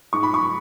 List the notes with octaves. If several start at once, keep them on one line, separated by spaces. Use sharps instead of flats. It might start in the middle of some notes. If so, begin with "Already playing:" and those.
G#2 C#6
B5
C#6